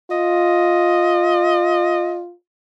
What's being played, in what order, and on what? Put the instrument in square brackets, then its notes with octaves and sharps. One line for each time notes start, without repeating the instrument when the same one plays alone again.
[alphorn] F4 [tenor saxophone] D#5